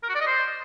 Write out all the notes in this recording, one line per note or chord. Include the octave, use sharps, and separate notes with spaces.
A#4
F#4
D5
D#5
C5